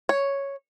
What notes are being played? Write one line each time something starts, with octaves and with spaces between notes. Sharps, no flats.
C#5